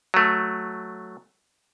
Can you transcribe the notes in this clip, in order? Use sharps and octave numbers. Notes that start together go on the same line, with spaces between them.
F#3 A3